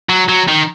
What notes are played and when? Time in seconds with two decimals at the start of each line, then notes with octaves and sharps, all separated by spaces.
0.09 F#3
0.29 F#3
0.48 D#3